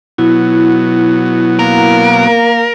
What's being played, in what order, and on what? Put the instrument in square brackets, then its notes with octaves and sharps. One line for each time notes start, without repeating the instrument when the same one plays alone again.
[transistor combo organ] B2 F#3 B3 [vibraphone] E4
[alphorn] A#3 [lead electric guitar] A#4